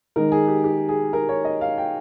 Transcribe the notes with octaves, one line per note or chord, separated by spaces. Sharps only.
D#3 G#3 D#4 A#4
G#4
G4
G4
G#4
A#4
C#5
D#5
F5
G5